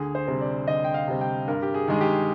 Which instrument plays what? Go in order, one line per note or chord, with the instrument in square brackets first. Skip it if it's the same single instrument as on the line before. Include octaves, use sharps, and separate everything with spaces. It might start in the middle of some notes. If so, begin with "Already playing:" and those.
Already playing: [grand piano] D2 G#4
C5
C3 G3 C4
D5
D2 D#5
G5
F5
C3 G3 C4
G5
G2 A#4
G4
G#4
D#3 G#3 G#4
G4